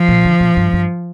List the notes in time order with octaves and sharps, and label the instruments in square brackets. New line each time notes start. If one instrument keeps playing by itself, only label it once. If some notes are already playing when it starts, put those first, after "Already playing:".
Already playing: [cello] F3
[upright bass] A#2
D3
A#2
G2
G2